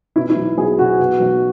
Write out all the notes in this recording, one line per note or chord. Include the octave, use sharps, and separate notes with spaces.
B2 E4
E4
B1
B1 G#4
B2 F#4
B2
B1